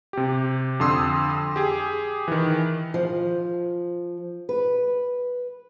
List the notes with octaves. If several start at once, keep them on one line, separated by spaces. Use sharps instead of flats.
C3 G4
F2 D3 C6 D#6 E6
G4 G#4
D#3 E3
F3
B4